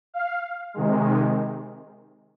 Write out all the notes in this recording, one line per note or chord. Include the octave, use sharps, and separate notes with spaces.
F5
C3 D#3 G#3